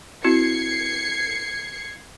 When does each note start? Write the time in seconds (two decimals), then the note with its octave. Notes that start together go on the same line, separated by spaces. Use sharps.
0.24 C4 E4 F#4 G#6 C7 C#7